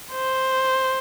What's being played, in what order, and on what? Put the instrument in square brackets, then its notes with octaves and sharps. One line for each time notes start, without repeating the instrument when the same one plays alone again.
[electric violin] C5